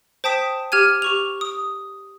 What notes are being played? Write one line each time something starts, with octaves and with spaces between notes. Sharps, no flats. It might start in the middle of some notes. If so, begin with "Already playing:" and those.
C5 G5 A5 D#6 B6 E7
G4 F6 G#6 D#7
G4 C#6 F7
D#6